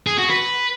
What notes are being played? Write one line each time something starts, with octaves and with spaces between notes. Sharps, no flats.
G#4
F#4
B4